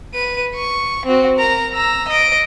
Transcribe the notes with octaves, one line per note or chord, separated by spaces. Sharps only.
B4 D#7
C#6
C4 F#4
A#4 A#5
A#5 E6
D#5 D7